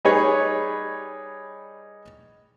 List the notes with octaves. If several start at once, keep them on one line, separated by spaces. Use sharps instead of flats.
G3 D#4 G#4 B4 C#5